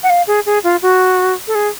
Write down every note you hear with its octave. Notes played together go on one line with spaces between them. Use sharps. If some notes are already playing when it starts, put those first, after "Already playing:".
F#5
F5
G#4
G#4
F4
F#4
A4
G#4